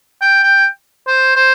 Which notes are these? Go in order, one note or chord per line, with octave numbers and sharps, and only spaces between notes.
G5
G5
C5
C5